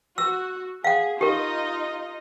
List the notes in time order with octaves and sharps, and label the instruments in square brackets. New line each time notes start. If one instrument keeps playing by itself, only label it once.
[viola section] F#4 [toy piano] E6
[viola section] G#4 [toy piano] F5 F#5
[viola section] D#4 F4 D#5 [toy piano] G4 A#4